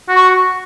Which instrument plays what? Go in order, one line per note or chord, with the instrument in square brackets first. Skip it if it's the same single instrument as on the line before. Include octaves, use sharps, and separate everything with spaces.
[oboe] F#4
[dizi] C#6